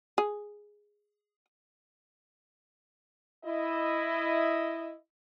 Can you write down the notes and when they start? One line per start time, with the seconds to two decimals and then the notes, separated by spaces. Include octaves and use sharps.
0.18 G#4
3.44 E4 D#5